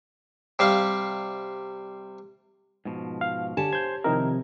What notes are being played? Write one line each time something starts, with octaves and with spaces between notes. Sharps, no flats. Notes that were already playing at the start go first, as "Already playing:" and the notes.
C3 G3 F5
G#2 B2 F3
F5
D3 G4 C#5 G#5 A5
C5 G6 G#6
C3 D#3 F3 C4 D#4 E4 A#4